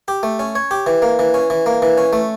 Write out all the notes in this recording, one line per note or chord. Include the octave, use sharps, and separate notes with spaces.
G4
A3
C#4
C#5
G4
E3
A#3
E3
C#4
E3
A#3
E3
C#4
A3